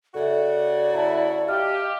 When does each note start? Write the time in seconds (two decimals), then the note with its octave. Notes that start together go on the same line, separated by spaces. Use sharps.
0.15 C#3 F#4 A4 D5 E5
0.93 A3 E4 A5 A#5
1.47 G4 D#5 F5 F6